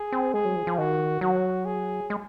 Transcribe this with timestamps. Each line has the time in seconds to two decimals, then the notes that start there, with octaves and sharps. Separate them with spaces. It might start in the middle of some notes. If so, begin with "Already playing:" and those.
Already playing: G#4
0.12 C4
0.34 G#3 G#4
0.45 F#3
0.56 F3
0.67 F3
0.78 D#3 F#4
1.21 F#3 F#4
1.66 G#4
2.10 G#3